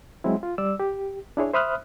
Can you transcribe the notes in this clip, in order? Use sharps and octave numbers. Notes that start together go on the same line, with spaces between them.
F#3 G#3 C4 E4
F4
G3 D5 E6
G4
D4 E4 G#4 C#5
C5 E5 B5 D#6 F6 F#6